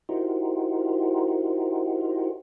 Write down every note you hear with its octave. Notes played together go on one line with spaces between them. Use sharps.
D#4 E4 F#4 G4 A#4 C5